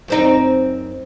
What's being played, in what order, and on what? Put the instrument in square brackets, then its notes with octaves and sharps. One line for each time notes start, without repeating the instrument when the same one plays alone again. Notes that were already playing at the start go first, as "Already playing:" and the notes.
[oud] F#2 C4 D#4